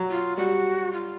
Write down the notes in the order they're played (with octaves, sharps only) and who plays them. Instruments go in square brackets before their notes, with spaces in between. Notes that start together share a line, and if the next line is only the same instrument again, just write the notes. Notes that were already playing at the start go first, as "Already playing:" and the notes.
Already playing: [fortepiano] F#3
[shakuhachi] F4
[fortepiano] G3 [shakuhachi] F#4
[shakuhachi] F4